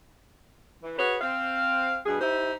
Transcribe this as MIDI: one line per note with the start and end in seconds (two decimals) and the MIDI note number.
0.83 0.98 52
0.98 1.16 66
0.98 1.16 68
0.98 1.16 71
0.98 1.16 73
1.21 1.98 60
1.21 1.98 77
2.06 2.20 43
2.06 2.20 47
2.06 2.20 68
2.21 2.52 63
2.21 2.52 64
2.21 2.52 67
2.21 2.52 72